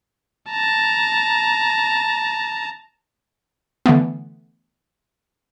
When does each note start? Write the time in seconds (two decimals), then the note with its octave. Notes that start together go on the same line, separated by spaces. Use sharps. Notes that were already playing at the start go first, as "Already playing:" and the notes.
0.50 A5 A#5
3.86 D3 E3 A3 B3